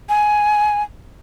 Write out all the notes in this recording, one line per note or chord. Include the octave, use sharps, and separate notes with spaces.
G#5